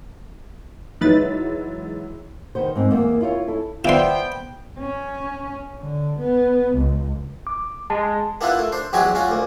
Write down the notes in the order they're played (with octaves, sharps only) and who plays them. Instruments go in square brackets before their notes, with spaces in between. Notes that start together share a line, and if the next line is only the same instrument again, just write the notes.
[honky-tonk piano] E3 F#3 G#3 [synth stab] D#4 B4 A6
[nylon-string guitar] D#3 B3 C5
G#2 C4
E2 A#3
E4 F4 C5 C#5
E4 A4
[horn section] B3 G5 [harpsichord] F4 C6 [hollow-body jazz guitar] C5 D5 E5
[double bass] C#4
D3
B3
C#2
[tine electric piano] D6
[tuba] G#3 [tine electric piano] A5
[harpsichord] A#3 B3 D4 E4 F4 B4
A3
D4 C5
E2 F#3 G#3 F#4 G4 G#5
C#4 F4 F#4
D2 A#3